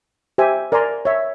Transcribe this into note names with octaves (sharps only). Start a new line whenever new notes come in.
G4 C5 E5 G#5
A#4 D5 G#5 A#5 C6
C#5 E5